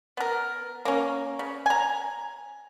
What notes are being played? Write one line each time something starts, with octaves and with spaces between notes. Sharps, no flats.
B3 A#4
A#3 C#4
C#3
G#5 A#5